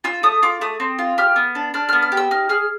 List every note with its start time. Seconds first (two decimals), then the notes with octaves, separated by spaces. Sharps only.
0.04 F4 E6
0.23 A3 D#6
0.42 F4 D6
0.61 A3 D#6
0.80 C4
0.99 F4
1.18 G4 F6
1.36 B3
1.55 D4
1.74 D4 F6
1.89 B3 F6
2.02 F6
2.12 G4
2.17 E6
2.31 D#4 F6
2.49 G#4 F6